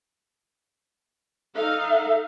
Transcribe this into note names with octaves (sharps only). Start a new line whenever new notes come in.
D#4 A4 F5